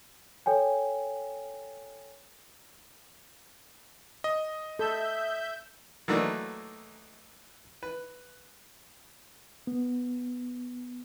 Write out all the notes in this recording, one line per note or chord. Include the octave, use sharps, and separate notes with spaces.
A4 C#5 G5 G#5
D#5
A4 E5 G6
E3 F#3 A3 A#3 D4 D#4
B4
B3